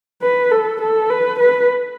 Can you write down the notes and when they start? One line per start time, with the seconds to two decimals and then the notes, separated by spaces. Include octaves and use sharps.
0.22 B4
0.52 A4
0.81 A4
1.10 B4
1.39 B4